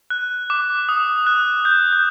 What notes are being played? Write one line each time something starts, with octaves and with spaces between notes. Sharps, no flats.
F#6
D6
D#6
F#6
G6
G6